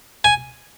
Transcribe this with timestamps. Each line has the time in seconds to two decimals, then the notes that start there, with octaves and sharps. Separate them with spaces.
0.24 G#5